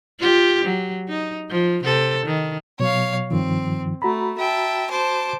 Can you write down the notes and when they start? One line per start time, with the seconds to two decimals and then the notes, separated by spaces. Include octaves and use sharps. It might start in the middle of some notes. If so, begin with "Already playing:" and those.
0.20 F4 G4
0.65 F#3
1.08 D#4
1.50 F3
1.84 C3 A4
2.26 D#3
2.80 B2 F#3 C#5 F5
3.31 G2 D#3 F3 C4
4.02 A3 F#4 A#5 B5
4.38 E5 G5 A5
4.90 C5 A5 D6